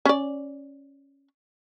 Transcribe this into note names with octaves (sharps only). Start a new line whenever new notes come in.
C#4 D5